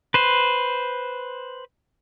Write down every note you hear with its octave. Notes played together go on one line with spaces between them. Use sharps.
B4 C5